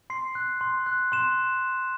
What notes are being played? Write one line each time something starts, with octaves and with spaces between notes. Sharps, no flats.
C6 C7
F#6
C6
F#6
C6 E7